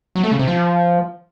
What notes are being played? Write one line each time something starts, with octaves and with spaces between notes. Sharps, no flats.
F#3
A3
C#3
C3
F3